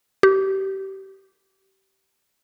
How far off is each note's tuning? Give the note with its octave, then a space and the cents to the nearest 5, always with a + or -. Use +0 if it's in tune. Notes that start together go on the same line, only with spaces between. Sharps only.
G4 -25